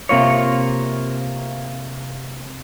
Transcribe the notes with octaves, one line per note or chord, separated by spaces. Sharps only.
C3 A#3 F4 C#5